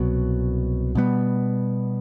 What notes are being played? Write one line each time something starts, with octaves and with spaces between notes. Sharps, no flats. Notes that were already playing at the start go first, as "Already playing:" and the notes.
Already playing: C2 B2 F#3
B2 G3 B3